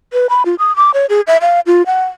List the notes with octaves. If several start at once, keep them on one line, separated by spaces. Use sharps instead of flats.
B4
B5
F4
D#6
D6
C#5
G#4
E5
F5
F4
F#5